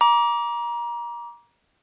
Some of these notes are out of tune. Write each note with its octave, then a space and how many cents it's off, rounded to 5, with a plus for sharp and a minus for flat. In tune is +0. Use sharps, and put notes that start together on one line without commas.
A#5 +30 D6 -15